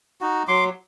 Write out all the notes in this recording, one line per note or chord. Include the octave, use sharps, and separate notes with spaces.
D#4 F#4
F#3 C6 D6